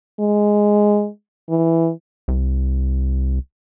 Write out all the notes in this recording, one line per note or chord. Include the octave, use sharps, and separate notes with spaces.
G#3
E3
C2